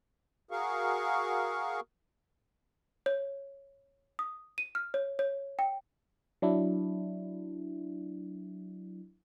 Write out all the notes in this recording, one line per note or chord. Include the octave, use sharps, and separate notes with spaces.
F#4 G#4 A#4 F5 C#6
C#5
D#6
D#7
F6
C#5
C#5
G5
F#3 D4 E4